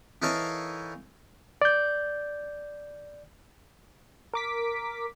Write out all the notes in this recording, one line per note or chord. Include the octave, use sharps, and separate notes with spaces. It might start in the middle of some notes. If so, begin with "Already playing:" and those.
E3 D#4 A4 A#4 C#5 F5
D5 G6
A#4 D6 B6